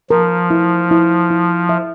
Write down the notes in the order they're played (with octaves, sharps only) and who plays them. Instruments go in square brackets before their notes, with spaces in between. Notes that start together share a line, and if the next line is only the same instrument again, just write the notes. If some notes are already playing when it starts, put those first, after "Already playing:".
[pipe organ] F3 [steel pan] A#4
[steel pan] E4
E4
E4
E5